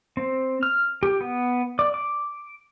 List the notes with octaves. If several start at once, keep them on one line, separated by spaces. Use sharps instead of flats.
C4
F6
G4
B3
D5
D6